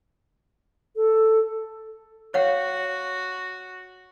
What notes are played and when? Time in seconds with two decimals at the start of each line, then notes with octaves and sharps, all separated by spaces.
0.96 A4
2.34 F#4 C#5 F5 F#5